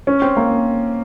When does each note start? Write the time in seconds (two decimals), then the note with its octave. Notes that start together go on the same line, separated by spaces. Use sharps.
0.07 C#4
0.22 C4
0.37 A#3